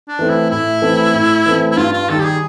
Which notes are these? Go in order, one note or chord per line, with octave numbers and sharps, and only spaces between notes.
D4
E3 A3 C4
E4
A2 E4
E3 A3 C4
A2
E3 A3 C4
E4
G2 F4
F4
D#3 G3 A4
G4
G#4